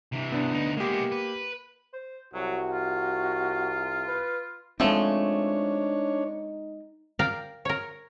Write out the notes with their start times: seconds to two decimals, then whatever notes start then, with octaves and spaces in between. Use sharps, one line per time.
0.12 C3 E3
0.32 B3 D4
0.53 D2 D#4
0.77 G#3 A#3 B3 G4
1.12 B4
1.93 C5
2.34 C2 F#3 F#4
2.73 F4
4.08 B4
4.80 F3 G#3 A3 C4 D4 D#4 C#5
7.19 A#4 D5 F5 G5
7.65 A#4 C#5